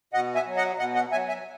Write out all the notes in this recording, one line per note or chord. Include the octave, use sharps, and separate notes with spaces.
B2 D#5 F#5
E5 G#5
F#3
D#5 F#5
B2 D#5 F#5
D#5 F#5
F#3 E5 G#5
E5 G#5